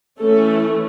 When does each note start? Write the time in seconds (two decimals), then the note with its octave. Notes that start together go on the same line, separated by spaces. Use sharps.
0.20 E3 A3 C#4 A4